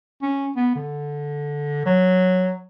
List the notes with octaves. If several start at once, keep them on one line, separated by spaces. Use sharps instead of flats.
C#4
B3
D3
F#3